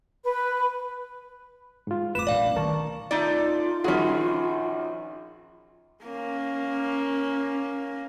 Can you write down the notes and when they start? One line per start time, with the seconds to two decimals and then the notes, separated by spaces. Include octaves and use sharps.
0.24 B4
1.87 G#2 F4
2.15 F1 B4 D6 E7
2.27 A#1 C#4 D5 F5
2.56 D#3 A#4 A5 C#6
3.11 A3 D#4 F4 D5
3.84 A#1 D#3 C#4 F#4 G#4
6.05 A#3 C#4